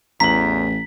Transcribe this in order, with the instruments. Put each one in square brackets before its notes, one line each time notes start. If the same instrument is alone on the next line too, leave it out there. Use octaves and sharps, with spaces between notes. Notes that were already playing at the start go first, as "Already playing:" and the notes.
[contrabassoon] A1 [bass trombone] E2 [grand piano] A#5 F#7 [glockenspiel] B6